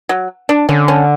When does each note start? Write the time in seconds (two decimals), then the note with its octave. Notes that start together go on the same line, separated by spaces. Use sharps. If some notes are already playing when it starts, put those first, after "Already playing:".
0.09 F#3
0.49 D4
0.69 D3 C#4
0.88 C#4